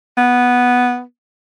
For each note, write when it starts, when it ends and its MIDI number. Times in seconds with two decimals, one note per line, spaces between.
0.17 1.02 59